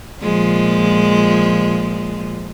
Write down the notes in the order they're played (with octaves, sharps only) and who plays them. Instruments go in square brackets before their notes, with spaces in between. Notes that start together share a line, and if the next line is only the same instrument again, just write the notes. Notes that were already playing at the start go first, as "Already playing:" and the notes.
[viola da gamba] A#2 F3 G#3